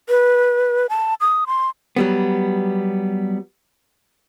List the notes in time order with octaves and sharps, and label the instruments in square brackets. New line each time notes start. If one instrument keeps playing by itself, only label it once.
[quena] B4
A5
D#6
C6
[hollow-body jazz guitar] F#3 G3 B3